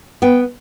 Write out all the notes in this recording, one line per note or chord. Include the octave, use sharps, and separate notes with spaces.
B3 G5